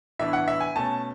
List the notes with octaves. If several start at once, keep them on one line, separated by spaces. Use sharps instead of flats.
A2 E3 B3 D4 E5
F#5
E5
G#5
B2 A3 C#4 A5